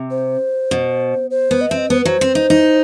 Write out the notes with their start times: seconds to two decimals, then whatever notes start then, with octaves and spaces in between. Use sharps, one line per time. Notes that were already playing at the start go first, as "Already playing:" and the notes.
Already playing: C3
0.11 C5
0.71 B2
1.31 C5
1.51 B3
1.61 D#5
1.70 C4 E5
1.78 D#5
1.90 B3 C5
1.99 B4
2.05 F#3 C5
2.21 C4
2.35 D#4
2.50 D#4